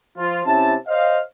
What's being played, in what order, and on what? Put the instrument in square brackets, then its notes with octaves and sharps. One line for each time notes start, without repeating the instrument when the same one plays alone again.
[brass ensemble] F3 F4
C3 C#4 E4 A5
C5 C#5 D#5 F5